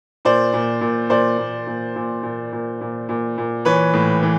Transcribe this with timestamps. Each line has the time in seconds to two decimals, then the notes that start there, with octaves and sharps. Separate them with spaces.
0.25 A#2 C5 D5
0.53 A#2
0.81 A#2
1.10 A#2 C5 D5
1.38 A#2
1.67 A#2
1.96 A#2
2.23 A#2
2.52 A#2
2.81 A#2
3.09 A#2
3.38 A#2
3.65 E3 B4 C#5
3.94 A2
4.23 E3